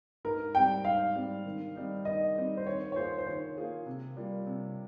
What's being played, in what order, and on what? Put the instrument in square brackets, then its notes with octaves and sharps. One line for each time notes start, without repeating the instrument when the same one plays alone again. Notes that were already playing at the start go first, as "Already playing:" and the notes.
[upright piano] G#2 [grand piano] A#4
[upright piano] G3 C4 G4 [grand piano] G5
[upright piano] G#2 [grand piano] F5
[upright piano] G3 C4 G4
D#3
G3 C4 D#4
[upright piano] D#3 [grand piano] D#5
[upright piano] G3 C4 D#4
[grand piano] C5
[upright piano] D#3 [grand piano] C#5
[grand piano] C#5
[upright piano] A#3 F4 G#4 [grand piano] C5
[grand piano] C5
[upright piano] D#3 [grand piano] C#5
[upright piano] A#3 F4 G#4
C3
G3 A#3 F4
C3